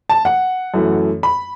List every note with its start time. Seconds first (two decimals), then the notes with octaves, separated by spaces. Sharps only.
0.10 A5
0.25 F#5
0.74 F#2 E3 A3
1.23 B5